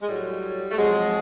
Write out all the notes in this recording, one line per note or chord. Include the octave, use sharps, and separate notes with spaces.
G#3
A2 F#3 G3
A3
C3 F3 F#3 G#3